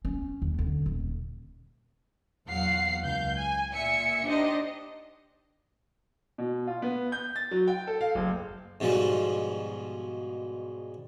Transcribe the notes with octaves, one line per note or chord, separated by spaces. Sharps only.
C#4
D#2
D3
D#1
E2 A#2 F#3 F5 F#5 C7
C#2 F5 G6
G#5
A#2 E5 G#5 C#7
D4 D#4 G4 C5 D#5
B2
F4
B3
G6
A6
F#3
G5
A4
F5
F#1
G#2 B2 F3 G3